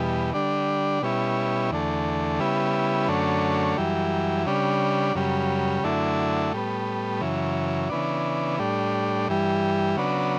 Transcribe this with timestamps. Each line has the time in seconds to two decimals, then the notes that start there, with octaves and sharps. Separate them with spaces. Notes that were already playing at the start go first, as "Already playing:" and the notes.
Already playing: E2 B2 G3
0.34 D3 G3 D4
1.02 B2 G3 C#4 E4
1.71 E2 D3 A3
2.39 C#3 G3 B3 E4
3.08 F#2 D3 A3 C#4
3.78 F#2 E3 G3
4.46 C#3 G3 D4
5.15 F#2 C#3 G3
5.84 F#2 D3 A3 E4
6.53 A2 G3 B3
7.21 F#2 C#3 E3
7.90 C#3 E3 B3 D4
8.59 A2 G3 D4
9.28 G2 E3 G3
9.97 C#3 F#3 B3 D4